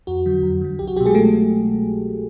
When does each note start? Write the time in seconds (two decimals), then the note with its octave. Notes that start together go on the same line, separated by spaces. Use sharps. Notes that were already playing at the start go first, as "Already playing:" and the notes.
0.07 F2 F#4
0.26 D3 F#3
0.43 F2
0.61 D3 F#3
0.79 C2 G4
0.88 F#4
0.96 B2 F#3 G4
1.06 G#3 G#4
1.14 A3 A4